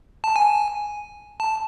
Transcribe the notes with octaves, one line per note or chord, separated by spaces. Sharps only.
A5
G#5
A5